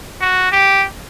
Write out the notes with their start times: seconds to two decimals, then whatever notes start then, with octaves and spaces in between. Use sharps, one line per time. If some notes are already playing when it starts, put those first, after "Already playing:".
0.21 F#4
0.52 G4